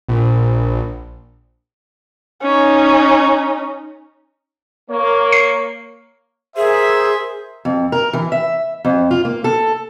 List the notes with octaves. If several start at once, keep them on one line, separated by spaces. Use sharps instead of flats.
A#1
C#4 D#4
A#3 C#5
C7
G#4 A#4 C5 E5
F2
A#4
E3
E5
F2
F4
A#3
A4